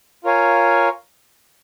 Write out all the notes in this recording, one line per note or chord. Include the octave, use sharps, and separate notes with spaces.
F4 A#4 C#5 F5 G#5